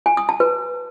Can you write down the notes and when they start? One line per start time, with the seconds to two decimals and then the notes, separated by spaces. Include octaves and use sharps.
0.06 G#5
0.17 D#6
0.29 A5
0.40 B4